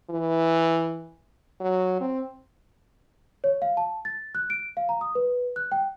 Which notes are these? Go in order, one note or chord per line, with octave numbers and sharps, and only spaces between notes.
E3
F#3
C4
C#5
F5
A5
A6
F#6
D7
F5
A#5
D#6
B4
F#6
G5